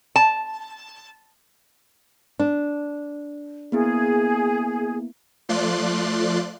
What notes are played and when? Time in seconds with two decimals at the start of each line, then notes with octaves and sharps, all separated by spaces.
0.16 A5
2.39 D4
3.72 A#3 B3 E4 G#4
5.49 F3 A3 F4 D5 C6 F#6